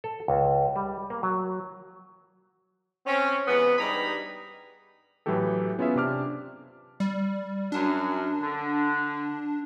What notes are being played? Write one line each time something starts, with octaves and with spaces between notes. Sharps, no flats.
A4
C#2
G3
A#3
F#3
C4 C#4
C3 E3 G#3 B3
G2 G3 D#4 G#4 A#5 B5
A2 E3 F#3 A3 G4 A4
B3 C#4 F4 G#4 E5 G#5
C3 D4 D6 F6
G3
F#2 D4
D3